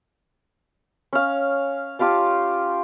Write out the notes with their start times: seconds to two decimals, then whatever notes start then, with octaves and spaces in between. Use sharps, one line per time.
1.13 C#4 F5
1.99 F4 G4 F5 A5